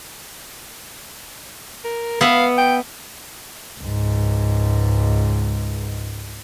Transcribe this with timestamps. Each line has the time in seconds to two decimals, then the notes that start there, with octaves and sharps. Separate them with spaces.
1.84 A#4
2.21 B3 E5 F5 B5
2.58 G5
3.80 C#2 G#2